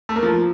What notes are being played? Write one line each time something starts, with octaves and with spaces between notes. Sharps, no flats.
A3
A#3
F3